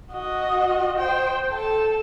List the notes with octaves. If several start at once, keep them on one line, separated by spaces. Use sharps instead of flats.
F#4 D#5
C5 G5
A4 A5